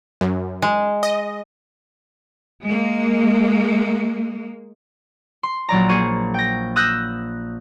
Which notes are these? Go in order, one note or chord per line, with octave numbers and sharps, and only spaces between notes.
F#2
G#3
D#5
G#3 A#3
C6
A#1 F#3 D5 A#5
A#3 G#4 C5 C#6 D#7
G5 A#6
D#6 E6 F#6 G6 A#6